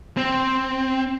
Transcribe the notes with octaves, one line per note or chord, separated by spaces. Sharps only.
C4